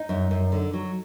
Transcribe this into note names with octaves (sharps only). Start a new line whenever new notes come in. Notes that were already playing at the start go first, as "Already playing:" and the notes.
Already playing: D#4
F#2
F#2
D3
F#3